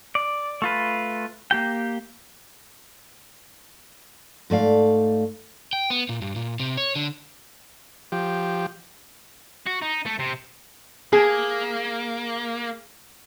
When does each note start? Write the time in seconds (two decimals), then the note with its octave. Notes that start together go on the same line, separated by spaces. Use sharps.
0.15 D5
0.62 A3 F4 B4
1.51 A#3 G4 G5
4.50 G#2 A3 D5 F5
5.73 G5
5.90 B3
6.09 A#2
6.22 G2
6.36 A#2
6.60 C3
6.77 C#5
6.96 D3
8.12 F3 G4
9.67 F#4
9.82 D#4
10.06 A3
10.20 C3
11.13 A#3 G#4